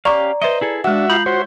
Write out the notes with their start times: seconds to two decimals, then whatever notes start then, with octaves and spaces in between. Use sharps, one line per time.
0.05 C#4 G4 D5 F5 A#5 C#6 D6
0.42 B4 C5 D#5 E5
0.61 E4 G#4 A4
0.84 G#3 D4 F#4 E5 F#5
1.10 F4 F5 A#5 B5 G6
1.26 F#4 C5 C#5 E5 C6